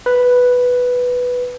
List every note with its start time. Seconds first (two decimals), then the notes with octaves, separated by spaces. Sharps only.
0.06 B4